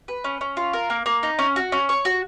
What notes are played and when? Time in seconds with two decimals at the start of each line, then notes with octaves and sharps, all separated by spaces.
0.08 B4
0.24 C#4
0.41 C#4
0.57 F4
0.73 A#4
0.90 A#3
1.06 A#3
1.23 D#4
1.39 C#4
1.56 F#4
1.72 C#4
1.89 C#5
2.05 F#4